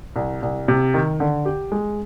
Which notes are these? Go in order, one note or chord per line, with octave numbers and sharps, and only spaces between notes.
C2
C2
C3
D#3
D3
G4
G#3